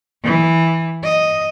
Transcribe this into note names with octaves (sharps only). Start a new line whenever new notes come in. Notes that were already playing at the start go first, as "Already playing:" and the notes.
E3
D#5